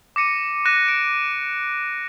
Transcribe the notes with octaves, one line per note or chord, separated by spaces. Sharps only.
D6 A#6 C#7 D#7
D6 F#6 A#6 D#7
D7